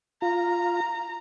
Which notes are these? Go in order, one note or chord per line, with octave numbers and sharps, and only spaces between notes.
F4 A#5